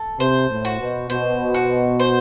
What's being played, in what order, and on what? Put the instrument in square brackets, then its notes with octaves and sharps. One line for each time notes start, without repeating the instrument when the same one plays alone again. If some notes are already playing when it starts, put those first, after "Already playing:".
Already playing: [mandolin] A4
[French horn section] C3 [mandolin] C5
[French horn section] A2
[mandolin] F#4
[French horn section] B2
[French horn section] B2 [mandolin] C5
[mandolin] F#4
C5